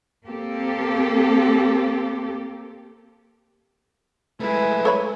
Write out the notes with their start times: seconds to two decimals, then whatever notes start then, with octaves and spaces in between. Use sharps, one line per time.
0.25 A#3 C4 G4 A4
4.40 G#3 A3 E4 B4 G#5
4.85 A4 C#5 B5